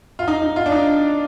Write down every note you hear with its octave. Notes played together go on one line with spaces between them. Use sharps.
F4
D#4
D#4
F4
D4
D#4